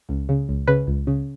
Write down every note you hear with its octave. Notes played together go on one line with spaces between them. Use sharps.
C#2
C#3
C#2
C#3 B4
C#2
C#3